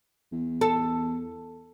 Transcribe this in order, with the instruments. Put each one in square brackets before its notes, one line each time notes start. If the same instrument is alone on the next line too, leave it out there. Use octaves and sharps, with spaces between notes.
[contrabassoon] E2
[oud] A4